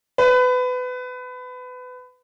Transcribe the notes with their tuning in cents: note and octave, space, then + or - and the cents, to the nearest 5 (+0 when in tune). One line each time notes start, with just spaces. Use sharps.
B4 +25